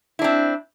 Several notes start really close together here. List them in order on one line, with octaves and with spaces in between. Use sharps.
E4 D4 C4